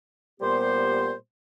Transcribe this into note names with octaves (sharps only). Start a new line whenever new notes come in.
A#2 G3 B3 G4 C5